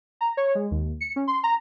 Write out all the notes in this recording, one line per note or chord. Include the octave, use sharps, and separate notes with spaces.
A#5
C#5
G#3
D#2
C#7
C#4
C6
A#5